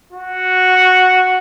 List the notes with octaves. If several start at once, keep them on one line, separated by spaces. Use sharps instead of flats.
F#4